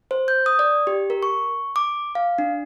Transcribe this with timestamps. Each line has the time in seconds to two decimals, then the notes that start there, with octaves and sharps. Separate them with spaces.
0.11 C5
0.28 G6
0.46 D#6
0.59 D5
0.87 G4
1.10 A#4
1.23 C#6
1.76 D6
2.15 F5
2.38 D4